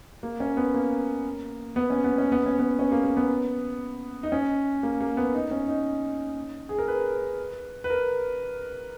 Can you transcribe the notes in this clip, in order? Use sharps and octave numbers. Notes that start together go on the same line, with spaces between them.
A#3
C#4
B3
A#3
B3
C#4
B3
C#4
B3
C#4
B3
C#4
A#3
A#3
B3
D#4
C#4
A#3
A#3
B3
D#4
C#4
D#4
G#4
A#4
B4
B4
A#4